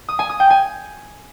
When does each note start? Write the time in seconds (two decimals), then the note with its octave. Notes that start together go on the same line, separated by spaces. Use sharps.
0.09 D#6
0.19 G#5
0.29 D#6
0.40 G5
0.50 G#5